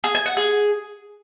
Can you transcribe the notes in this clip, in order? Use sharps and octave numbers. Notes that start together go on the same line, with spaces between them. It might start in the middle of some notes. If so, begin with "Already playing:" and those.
G#4
G#5
F#5
G#4